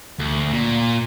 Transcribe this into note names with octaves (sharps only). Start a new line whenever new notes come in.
D2
A#2